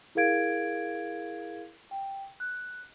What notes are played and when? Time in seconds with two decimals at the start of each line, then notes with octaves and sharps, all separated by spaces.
0.15 E4 G#4 A#4 F5 G#6 D7
1.91 G5
2.40 F#6